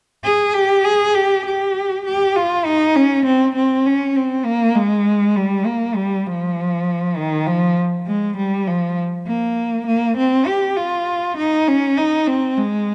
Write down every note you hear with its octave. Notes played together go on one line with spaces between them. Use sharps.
G#4
G4
G#4
G4
G4
G4
F4
D#4
C#4
C4
C4
C#4
C4
A#3
G#3
G3
A#3
G3
F3
D#3
F3
G#3
G3
F3
A#3
A#3
C4
G4
F4
D#4
C#4
D#4
C4
G#3